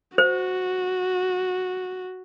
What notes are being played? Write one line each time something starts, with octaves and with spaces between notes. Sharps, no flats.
F#4 C5